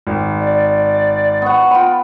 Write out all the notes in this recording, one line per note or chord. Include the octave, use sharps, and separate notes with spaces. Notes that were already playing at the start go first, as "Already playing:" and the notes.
G#1
D5
B3 F#5 C#6
F4 G5 B5